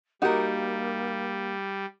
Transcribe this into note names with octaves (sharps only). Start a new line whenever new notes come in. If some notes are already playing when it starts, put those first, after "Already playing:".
G3 A#3 D#4 F#4 G4 A#4